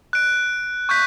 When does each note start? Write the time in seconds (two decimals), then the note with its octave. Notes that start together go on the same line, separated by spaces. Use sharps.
0.13 F#6 D7
0.89 C#6 F#6 G6 B6